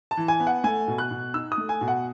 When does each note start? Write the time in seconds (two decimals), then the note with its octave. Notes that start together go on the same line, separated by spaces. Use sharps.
0.11 A5
0.17 E3
0.28 G#5
0.40 B3
0.47 F#5
0.64 A3 G#5
0.88 B2
0.98 F#6
1.11 B2
1.34 D#4 E6
1.52 D#6
1.58 A3
1.69 G#5
1.81 B2
1.88 F#5